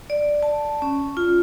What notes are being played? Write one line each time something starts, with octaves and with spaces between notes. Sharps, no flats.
D5
A5
C#4
F4